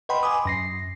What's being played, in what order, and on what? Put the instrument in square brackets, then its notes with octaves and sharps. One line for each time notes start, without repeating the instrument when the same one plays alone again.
[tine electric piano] B4 D#5 F#5 G5 B5 C6
G#5 B5 C6 D6 D#6
F#2 A#6 C7